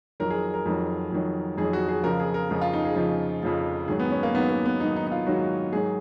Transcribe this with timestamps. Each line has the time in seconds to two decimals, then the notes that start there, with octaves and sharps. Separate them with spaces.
0.20 F2 D#3 F#3 A#4
0.30 G#4
0.54 A#4
0.66 F2 D#3 F#3
1.12 F2 D#3 F#3
1.57 F2 D#3 F#3 G#4
1.73 F#4
1.88 G#4
2.03 F2 C#3 F3 A#4
2.19 G#4
2.34 A#4
2.50 F2 C#3 F3 G#4
2.61 F4
2.73 D#4
2.85 G#4
2.96 F2 C#3 F3
3.43 F2 C#3 F3
3.88 G#2 D#3 F#3 G#4
4.00 B3
4.11 C#4
4.23 A#3
4.34 G#2 D#3 F#3 B3
4.50 A#3
4.66 B3
4.80 G#2 D#3 F#3 D#4
4.96 D#4
5.07 D#4
5.11 F4
5.27 G#2 D#3 F#3 F#4
5.73 G#2 D#3 F#3 G#4